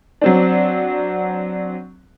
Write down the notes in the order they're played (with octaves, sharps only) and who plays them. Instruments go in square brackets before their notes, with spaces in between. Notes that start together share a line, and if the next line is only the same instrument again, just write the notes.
[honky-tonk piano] F#3 C4 D4